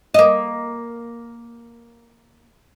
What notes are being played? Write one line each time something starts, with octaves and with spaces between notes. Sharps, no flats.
A#3 D#5